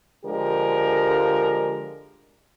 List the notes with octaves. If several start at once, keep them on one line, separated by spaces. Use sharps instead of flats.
D3 F3 G#3 G4 A#4